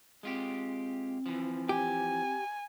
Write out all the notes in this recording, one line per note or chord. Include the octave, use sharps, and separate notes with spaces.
G#3 C4 F4 G4
E3 F3
G4 G#5